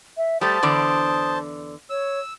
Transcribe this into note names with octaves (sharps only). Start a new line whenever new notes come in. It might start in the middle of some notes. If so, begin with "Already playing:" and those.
E5
G3 A3 C5 A5 D#6
E2 D3 D5
C#5 E6